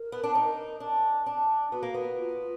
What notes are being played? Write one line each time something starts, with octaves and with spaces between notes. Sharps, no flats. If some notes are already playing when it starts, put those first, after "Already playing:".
Already playing: A#4
B3
D4
D#4
D4
D4
B3 F#4
A#3
B3
F4